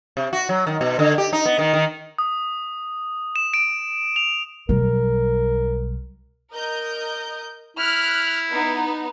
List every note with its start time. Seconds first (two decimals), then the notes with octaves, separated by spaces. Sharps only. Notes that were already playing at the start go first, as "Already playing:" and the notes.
0.17 C3
0.33 F#4
0.49 F#3
0.67 D#3
0.81 B2
0.99 D3
1.18 G4
1.33 D#4
1.46 B3
1.59 D#3
1.74 D#3
2.18 D#6
3.36 E7
3.54 D7
4.16 F7
4.69 B1 G3 A#4
6.52 A#4 D#5 G6
7.77 E4 F6 F#6
8.50 B3 D#4